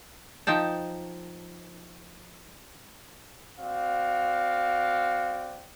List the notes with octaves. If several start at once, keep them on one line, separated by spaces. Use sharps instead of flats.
F3 D#4 G5 A5
C4 F#4 D5 F5